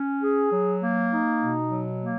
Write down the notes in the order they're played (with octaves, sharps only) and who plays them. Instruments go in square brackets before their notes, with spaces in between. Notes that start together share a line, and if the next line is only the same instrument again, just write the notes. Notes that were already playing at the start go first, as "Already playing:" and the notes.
Already playing: [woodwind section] C#4
G#4
F#3
A#3
D#4
B2
F#3
A#3